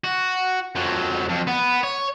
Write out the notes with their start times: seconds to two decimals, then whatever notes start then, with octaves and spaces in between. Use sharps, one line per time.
0.04 F#4
0.76 F2 F#3
1.29 F2
1.48 B3
1.83 C#5